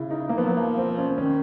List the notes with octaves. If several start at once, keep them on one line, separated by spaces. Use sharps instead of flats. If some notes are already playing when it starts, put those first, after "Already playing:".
Already playing: C#3 E4
D#4
A#3
F3 B3
F#3
F3 A#3
C4
C#4
D#3 C#4